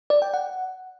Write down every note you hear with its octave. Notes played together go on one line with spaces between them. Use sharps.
D5
G5
F#5